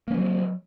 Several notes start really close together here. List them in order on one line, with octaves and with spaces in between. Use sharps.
A#3 C#4 F#3 C4